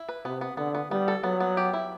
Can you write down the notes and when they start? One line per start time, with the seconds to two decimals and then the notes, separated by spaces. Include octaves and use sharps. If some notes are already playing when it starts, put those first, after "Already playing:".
Already playing: E4
0.09 B4
0.25 C3 B3
0.41 B3
0.57 D3 B3
0.75 B3
0.91 G3 B3
1.08 A4
1.23 F#3 B3
1.40 B3
1.57 G4
1.73 E4